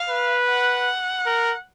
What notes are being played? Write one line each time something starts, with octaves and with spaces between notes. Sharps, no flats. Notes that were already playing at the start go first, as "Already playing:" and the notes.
Already playing: F5
B4
F#5
A#4